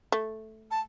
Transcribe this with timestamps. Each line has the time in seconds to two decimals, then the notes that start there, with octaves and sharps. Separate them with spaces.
0.12 A3
0.71 A5